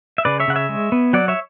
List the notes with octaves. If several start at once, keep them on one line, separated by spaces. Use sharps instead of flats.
E5
C#3 B4 D5
C#5 E5
C#3 F#5
C#5 E5
G#3
B3
F#3 D5 F#5
C#5 E5